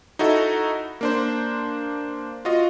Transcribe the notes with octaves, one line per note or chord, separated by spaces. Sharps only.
D#4 E4 F#4 A4
A#3 D4 C5
F4 F#4 D#5